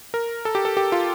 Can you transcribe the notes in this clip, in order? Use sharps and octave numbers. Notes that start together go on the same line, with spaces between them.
A#4
A4
G4
A4
G4
F4